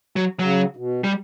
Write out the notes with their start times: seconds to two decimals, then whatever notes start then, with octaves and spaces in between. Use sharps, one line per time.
0.16 F#3
0.40 C#3 F#3
0.76 B2
1.04 G3